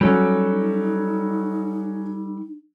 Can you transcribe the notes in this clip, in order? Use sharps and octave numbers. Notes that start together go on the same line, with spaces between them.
F#3 G3 C#4 D#4 A4